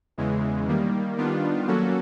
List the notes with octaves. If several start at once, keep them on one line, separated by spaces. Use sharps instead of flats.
E2 C#3 E3 G#3
D#3 G3 A#3
D#3 G3 B3 D4 F4
F#3 A#3 C#4 F#4 A4